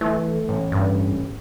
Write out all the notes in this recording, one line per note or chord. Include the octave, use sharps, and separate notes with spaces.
E3 A3
A1
G2